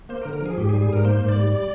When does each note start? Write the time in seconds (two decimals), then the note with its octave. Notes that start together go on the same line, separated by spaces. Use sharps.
0.09 A#3 C5
0.22 A#4
0.25 D3
0.33 A#4
0.41 F3 G#4
0.58 G#2 G4
0.69 G#4
0.73 G3
0.81 G#4
0.90 G#2 A#4
1.04 A#3 C5
1.21 G#2
1.29 D5
1.37 G3
1.52 D5